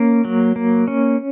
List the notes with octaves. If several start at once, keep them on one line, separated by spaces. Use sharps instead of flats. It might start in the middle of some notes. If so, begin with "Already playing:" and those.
Already playing: A#3 C#4
F#3
A#3
C#4